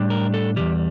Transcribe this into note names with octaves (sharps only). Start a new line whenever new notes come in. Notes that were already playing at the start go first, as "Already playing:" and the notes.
Already playing: A2 G3 D4
A#4
A4
E2 E3 G3 G4